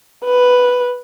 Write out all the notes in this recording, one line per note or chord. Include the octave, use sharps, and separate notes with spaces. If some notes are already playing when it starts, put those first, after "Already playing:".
B4